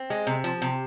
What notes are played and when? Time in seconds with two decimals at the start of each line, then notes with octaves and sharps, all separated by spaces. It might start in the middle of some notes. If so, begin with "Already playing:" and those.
Already playing: C4
0.10 G#3
0.27 C3
0.44 F3
0.62 C3